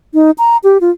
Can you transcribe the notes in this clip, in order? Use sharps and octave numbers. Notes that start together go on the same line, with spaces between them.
D#4
A#5
G4
F4